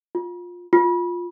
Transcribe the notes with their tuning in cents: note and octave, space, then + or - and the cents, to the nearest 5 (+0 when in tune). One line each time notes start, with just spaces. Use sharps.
F4 +20
F4 +10